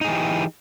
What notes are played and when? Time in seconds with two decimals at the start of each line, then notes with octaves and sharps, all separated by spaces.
0.01 D#4
0.05 G#4
0.08 E3
0.11 G4